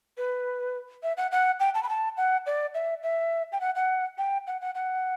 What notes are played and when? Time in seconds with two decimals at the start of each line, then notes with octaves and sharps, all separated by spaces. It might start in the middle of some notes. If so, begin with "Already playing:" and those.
0.17 B4
1.03 E5
1.17 F#5
1.32 F#5
1.60 G5
1.74 A5
1.83 B5
1.89 A5
2.17 F#5
2.46 D5
2.74 E5
3.03 E5
3.52 G5
3.61 F#5
3.75 F#5
4.18 G5
4.47 F#5
4.61 F#5
4.75 F#5